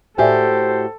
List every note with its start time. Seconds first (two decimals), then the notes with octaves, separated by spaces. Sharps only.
0.18 A2 F#4 G4 A4 C5 D5 E5 G#5